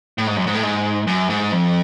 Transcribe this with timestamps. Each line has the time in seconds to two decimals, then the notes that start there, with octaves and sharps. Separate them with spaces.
0.18 A2
0.27 G#2
0.37 F#2
0.47 G#2
0.54 A2
0.63 G#2
1.07 F#2
1.29 G#2
1.52 F2